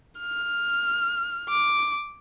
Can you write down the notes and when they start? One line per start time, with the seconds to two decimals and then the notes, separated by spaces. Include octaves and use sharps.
0.19 F6
1.49 D6